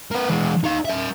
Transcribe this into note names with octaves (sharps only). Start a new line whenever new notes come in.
A#3 B4
E3 G#3
D#4 F5
A#4 E5